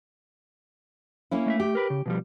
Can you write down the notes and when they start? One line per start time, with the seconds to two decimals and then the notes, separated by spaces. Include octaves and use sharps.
1.31 A#3 C#4 E4
1.46 A3 D#5 E5
1.60 G4
1.75 A#4 B4
1.90 C#3
2.06 B2 F3 G3